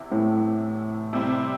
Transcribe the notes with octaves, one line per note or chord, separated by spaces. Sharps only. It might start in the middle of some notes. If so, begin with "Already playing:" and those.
Already playing: E2 C3 E3
A2
C3 G3 C4 E4